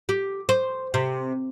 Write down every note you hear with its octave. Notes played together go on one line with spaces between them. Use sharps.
G4
C5
C3